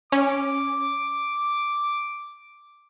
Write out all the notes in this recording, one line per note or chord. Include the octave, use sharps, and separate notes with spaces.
C#4 D6